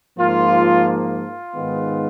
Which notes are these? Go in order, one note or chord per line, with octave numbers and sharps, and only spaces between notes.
G#2 F3 A#3 F4
F4
G#2 D#3 G#3 B3